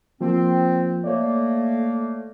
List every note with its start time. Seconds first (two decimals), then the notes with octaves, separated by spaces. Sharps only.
0.21 F3 A#3 C4 F4
1.04 A3 A#3 C#5 D5